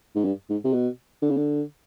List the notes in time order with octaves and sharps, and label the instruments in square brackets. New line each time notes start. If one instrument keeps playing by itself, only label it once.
[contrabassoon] G#2
G2
G#2
C3
B2
D3
C#3
D3